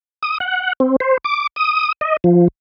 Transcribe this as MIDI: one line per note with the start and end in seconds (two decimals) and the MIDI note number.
0.23 0.38 87
0.40 0.73 78
0.80 0.96 60
1.00 1.17 72
1.24 1.47 86
1.56 1.92 87
2.01 2.17 75
2.24 2.48 53